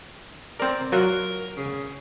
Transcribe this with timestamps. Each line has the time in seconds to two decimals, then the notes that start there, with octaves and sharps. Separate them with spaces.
0.60 C4 A#4 D5
0.92 F#3 F4 F#4 A#4
1.57 C#3